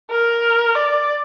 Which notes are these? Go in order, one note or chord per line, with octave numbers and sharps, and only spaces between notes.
A#4
D5